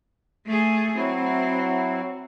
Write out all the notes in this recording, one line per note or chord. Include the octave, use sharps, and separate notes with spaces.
A3 G#4
F#3 C4 E4 F#4